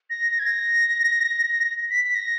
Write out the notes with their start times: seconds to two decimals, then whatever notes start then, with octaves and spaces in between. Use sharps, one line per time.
0.10 A#6
0.28 A#6
0.39 G#6
0.46 A#6
1.90 B6
2.04 B6
2.15 A#6